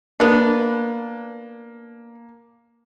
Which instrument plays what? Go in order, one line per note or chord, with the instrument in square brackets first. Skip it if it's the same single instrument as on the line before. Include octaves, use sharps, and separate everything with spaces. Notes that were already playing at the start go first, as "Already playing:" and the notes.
[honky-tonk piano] A#3 [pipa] B3 D4